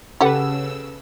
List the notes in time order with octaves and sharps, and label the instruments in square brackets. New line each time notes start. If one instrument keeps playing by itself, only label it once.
[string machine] C#3 E6 [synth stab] C#4 A4 B4 [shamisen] G4 F#5